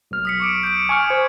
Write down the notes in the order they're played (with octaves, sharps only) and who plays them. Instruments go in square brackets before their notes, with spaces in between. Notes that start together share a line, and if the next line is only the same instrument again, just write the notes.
[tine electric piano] B1 F6
[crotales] D#6 B6 C#7
C#6 D6 D7
G6 D7
[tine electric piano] G#5 C#6 F6 [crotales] D#6 C#7
[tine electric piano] C5 [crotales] G#6